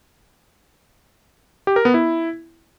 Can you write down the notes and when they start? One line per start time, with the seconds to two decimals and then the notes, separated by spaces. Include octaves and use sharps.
1.67 G4
1.76 A#4
1.85 B3
1.94 E4